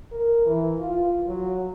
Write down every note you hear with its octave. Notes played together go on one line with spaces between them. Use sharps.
A#4
E3
F4
F#3